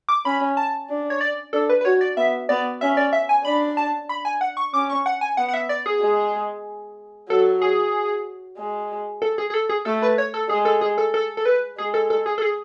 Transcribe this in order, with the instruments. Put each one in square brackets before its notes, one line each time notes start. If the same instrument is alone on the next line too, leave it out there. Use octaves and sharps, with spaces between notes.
[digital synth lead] D6
[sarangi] C#4 [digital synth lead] B5
[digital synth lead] A5
[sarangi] D4
[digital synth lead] C#5
D5
[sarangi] D4 [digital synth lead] A4
[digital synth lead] B4
B4
[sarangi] F#4 [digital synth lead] C#5
[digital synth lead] D5
[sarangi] B3 [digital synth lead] E5
[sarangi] B3 [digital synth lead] D5
[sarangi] C#4 [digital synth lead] E5
[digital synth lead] D5
E5
G#5
[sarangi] D4 [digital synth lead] B5
[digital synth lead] A5
B5
G#5
F#5
C#6
[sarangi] C#4 [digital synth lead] D6
[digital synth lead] C#6
F#5
G#5
[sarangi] B3 [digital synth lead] F#5
[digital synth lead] F#5
E5
D5
G#4
[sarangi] G#3
[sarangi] F#3 [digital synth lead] A4
[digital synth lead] G#4
[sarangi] G#3
[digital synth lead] A4
G#4
G#4
A4
G#4
[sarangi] A3 [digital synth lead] A4
[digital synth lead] B4
C#5
A4
[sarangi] G#3 [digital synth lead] G#4
[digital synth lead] A4
G#4
A4
A4
A4
B4
[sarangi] G#3 [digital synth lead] G#4
[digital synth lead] A4
A4
G#4
A4
G#4